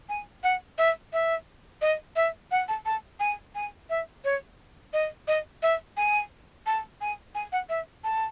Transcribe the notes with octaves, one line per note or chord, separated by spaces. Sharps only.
G#5
F#5
E5
E5
D#5
E5
F#5
A5
A5
G#5
G#5
E5
C#5
D#5
D#5
E5
G#5
A5
G#5
G#5
F#5
E5
A5